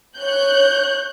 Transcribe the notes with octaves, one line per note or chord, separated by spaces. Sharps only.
C#5 F#6 G6